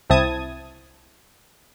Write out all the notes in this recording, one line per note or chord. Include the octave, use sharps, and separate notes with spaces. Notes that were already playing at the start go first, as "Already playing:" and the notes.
C2 C4 E4 A5 D#6 G#6